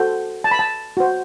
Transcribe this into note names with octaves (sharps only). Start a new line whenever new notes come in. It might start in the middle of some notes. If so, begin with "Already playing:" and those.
Already playing: F#4 A4 C5
A5
B5
A5
F#4 C5